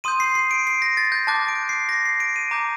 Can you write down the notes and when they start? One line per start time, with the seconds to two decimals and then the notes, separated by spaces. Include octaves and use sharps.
0.04 C6 D#6 G6 D#7
0.20 C7
0.35 C7
0.51 D7
0.67 C7
0.82 A#6
0.97 A6
1.12 G6
1.27 A5 D6 F#6 A6
1.48 D7
1.69 C7
1.89 A#6
2.05 C7
2.20 D7
2.36 D#7
2.51 A#5 D6 G6